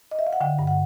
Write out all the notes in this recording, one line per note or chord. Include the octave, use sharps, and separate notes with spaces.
D#5
E5
F5
F#5
D3 G5
G2
F#5